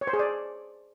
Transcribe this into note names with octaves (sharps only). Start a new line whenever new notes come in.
C#5
C5
G#4
D5